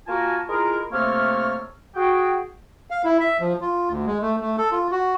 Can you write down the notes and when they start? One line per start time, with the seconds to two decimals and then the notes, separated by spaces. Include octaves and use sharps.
0.07 A#3 F4 F#4 A#4 G#5 A5
0.48 G#3 E4 F4 G#4 A#4
0.92 C3 A3 A#3 A4 C#5 F6
1.95 F#4 G#4 G5
2.91 F5
3.04 E4
3.20 E5
3.40 F3
3.61 F4
3.89 D2
4.06 G#3
4.22 A3
4.41 A3
4.58 A4
4.71 F4
4.91 F#4